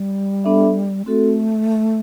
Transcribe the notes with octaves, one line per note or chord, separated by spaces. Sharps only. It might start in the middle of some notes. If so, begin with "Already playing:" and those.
Already playing: G3
B3 D4 A4 E5
A3 C4 F#4 A4